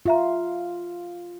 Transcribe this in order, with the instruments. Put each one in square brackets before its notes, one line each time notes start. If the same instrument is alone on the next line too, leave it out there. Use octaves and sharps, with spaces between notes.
[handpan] F4 [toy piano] G4 E5 A#5